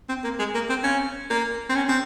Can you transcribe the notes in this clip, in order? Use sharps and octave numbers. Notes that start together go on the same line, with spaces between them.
C4
A#3
G#3
A#3
C4
C#4
A#3
C4
C#4
C4